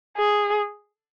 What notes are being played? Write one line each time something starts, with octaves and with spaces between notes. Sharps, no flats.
G#4